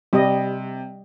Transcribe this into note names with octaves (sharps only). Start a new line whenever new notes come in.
C3 G3 D#5